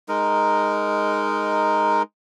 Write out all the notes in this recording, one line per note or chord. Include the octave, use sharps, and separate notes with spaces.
G#3 D#4 A#4